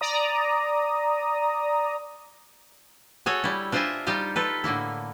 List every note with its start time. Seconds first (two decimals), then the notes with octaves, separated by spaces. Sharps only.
0.01 D5 A#5 D#6
3.26 F#4 G#4 A4 C#5
3.44 G3 E4
3.72 D4 F4 C5 D#5 E5 G#5
4.07 G3 D#4 F4 G4 F5
4.36 F4 A4 B4
4.64 A2 D3 A#3 E4